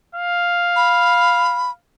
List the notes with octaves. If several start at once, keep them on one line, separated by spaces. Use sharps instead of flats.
F5
B5